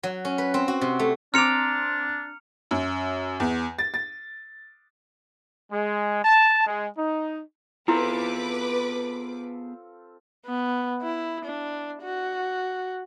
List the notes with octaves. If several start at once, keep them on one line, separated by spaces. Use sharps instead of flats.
F#3
C#4
B4
C4
F#4
C3
A3
C4 D4 A#5 D6 F6 C#7 F7
F#2
E2
A6
A6
G#3
A5
G#3
D#4
B3 C4 E4 F4 G#4 A4 B4 D6
B3
E4
D4
F#4